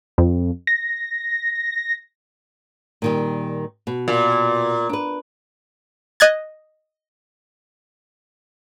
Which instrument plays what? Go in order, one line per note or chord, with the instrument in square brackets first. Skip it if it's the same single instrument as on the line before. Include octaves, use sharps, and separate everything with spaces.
[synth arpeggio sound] F2
A#6
[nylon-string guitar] A#2 D#3 G3
B2
[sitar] A#2
[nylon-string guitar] D4 B4
[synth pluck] D#5 F#6 G#6 A6